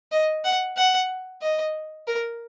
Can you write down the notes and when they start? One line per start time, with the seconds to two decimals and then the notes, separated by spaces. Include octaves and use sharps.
0.12 D#5
0.44 F#5
0.77 F#5
1.41 D#5
2.08 A#4